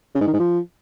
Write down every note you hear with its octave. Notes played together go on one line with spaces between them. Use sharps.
C#3
G#2
D#3
G#2
F3